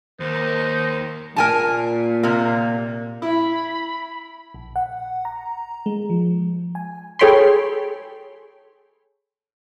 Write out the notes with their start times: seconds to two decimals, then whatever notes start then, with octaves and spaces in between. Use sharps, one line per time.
0.20 D#2 D#4 A#4 C5
1.36 A#2 A#4 G#5 A5
2.23 C3 A#3
3.22 E4 B5
4.54 A#1
4.76 F#5
5.25 A#5
5.86 G#3
6.10 F3
6.75 G#5
7.19 G#4 A4 C#5 G5 B5 C6